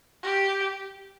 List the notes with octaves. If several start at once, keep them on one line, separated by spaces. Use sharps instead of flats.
G4